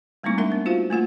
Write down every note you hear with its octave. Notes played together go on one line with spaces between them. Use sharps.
G3 A3 A#3 C4 D#4 E4
G#3 D4 A#4 E5
B3
D#4 F4 F#4 C5 F5
A3 A#3 F4 F#5